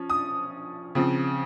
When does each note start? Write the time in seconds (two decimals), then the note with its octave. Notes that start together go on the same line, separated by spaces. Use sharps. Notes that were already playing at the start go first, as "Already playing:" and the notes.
Already playing: F3 C#4
0.10 D#6
0.95 C#3 F3 C4